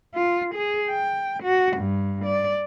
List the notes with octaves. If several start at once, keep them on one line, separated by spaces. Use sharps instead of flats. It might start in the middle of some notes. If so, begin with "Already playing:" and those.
F4
G#4
G5
F#4
G2
D5